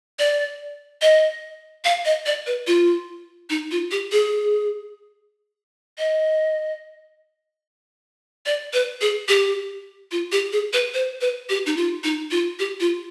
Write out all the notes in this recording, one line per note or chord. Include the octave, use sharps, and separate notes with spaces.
D5
D#5
F5
D#5
D5
B4
F4
D#4
F4
G4
G#4
D#5
D5
B4
G#4
G4
F4
G4
G#4
B4
C5
B4
G4
D#4
F4
D#4
F4
G4
F4